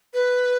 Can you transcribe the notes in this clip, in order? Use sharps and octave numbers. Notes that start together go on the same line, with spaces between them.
B4